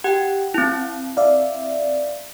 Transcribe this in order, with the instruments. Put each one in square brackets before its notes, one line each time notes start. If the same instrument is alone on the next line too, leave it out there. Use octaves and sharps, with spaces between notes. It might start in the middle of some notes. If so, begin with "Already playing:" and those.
[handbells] G4 G5 [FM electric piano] F#5
[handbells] C4 E4
[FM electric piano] D5 E5 F5